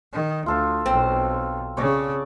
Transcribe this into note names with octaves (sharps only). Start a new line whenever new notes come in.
D#3
D2 F4 A4 F5
B1 C4
C#3 C#5 D5